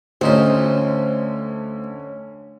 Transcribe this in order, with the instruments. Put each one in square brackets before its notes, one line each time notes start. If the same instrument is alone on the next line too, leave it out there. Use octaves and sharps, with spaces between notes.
[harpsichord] D2 D#4 F4 [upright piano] D3 C#4 [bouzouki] C5